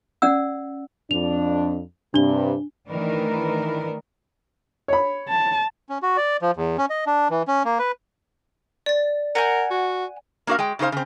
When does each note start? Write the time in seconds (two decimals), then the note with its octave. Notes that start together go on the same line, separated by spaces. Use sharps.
0.22 C#4 D5 F#5 E6
1.11 F2 D4 F7
2.14 G2 C3 D4 G7
2.89 D#3 E3 A3 D4 A#4 B4
4.88 C#5 B5
5.29 A5
5.90 C#4
6.02 F#4
6.17 D5
6.42 F3
6.56 E2
6.78 C#4
6.90 D#5
7.07 D4
7.30 E3
7.48 C#4
7.65 A#3
7.79 B4
8.86 D5 A6
9.35 A#4 F#5 G#5 G6
9.70 F#4
10.47 A#3 D4 F#4 A#4 F5
10.59 G#3 G5
10.79 C#3 D#4 F4 C5 F5
10.92 C#3 C4